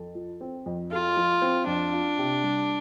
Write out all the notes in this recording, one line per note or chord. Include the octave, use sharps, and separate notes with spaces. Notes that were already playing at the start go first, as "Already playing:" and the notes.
Already playing: F2 A4
F3
C4
F2
F4 A4
F3
C4
F2 D4
F4
C3
G3